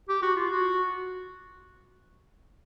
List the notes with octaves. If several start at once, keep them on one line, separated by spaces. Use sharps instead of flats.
G4
F#4
F4
F#4